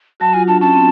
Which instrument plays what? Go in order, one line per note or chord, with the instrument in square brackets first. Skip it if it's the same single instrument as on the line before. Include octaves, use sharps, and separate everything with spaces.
[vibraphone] F#3 F#4 [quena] A5
[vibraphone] F4 [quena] G#5
[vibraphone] D4 [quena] A5
[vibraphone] C#4 [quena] A5
[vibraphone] C4